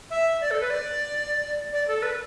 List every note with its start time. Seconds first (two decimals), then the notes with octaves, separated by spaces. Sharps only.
0.10 E5
0.41 D5
0.51 A4
0.61 B4
0.70 D5
1.73 D5
1.88 A4
1.98 A4
2.02 B4